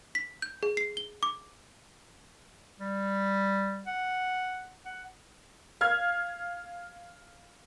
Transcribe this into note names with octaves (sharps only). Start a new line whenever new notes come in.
B6
G6
G#4
C7
G7
D6
G3
F#5
F#5
F5 F6 G#6